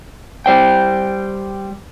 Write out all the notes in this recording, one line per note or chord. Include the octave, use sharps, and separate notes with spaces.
G3 C5 G5